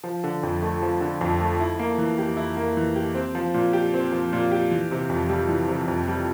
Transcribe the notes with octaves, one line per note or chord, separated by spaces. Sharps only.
F3
D3
F2
A3
F3
D3
F2
A3
E4
A#3
E3
G4
E4
A#3
E3
G4
C4
F3
A#2
G4
C4
F3
A#2
G4
E3
C3
F2
G3
E3
C3
F2
G3